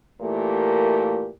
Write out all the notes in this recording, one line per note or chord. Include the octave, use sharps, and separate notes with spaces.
A#2 E3 A3 A#3 G4 A#4